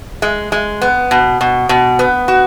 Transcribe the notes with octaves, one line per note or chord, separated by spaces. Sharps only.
G#3
G#3
B3
B2
B2
B2
B3
F#4